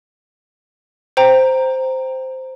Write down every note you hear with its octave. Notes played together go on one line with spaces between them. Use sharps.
C5 G5 A#5